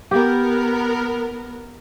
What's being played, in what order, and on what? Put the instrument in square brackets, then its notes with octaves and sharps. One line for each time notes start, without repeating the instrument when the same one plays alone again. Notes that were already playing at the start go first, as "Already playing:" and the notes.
[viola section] B3 A#4 [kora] G4